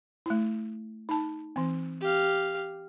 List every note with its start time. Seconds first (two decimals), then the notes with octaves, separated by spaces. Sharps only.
0.26 A3 E4
1.09 D#4 A5
1.56 E3 C4
2.01 G4 F5